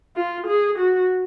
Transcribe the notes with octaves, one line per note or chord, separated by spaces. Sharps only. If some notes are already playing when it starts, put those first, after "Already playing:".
F4
G#4
F#4